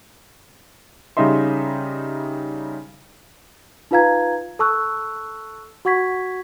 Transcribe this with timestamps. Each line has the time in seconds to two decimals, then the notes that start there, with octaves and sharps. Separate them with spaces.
1.17 C#3 G3 D#4 D#5 E5 C6
3.91 D#4 F4 B4 F5 A#5 G#6
4.59 A4 A5 C#6 E6 F#6
5.85 F#4 F#5 C#6 G#6 B6